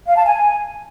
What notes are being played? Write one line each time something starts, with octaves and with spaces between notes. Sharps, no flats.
F5
A5
G#5